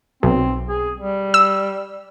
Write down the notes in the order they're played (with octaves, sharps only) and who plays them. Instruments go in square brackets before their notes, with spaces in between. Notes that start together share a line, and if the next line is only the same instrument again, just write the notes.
[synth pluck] B1 [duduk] C4
[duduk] G#4
G3
[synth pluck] E6